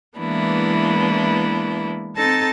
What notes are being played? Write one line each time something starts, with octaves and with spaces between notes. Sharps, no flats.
E3 G#3 A#3 B3 D4 E4
C4 D#4 A4 A5 A6 A#6